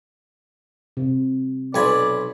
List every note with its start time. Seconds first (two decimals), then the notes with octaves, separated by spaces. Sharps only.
0.97 C3
1.74 B1 D5 G#5 B5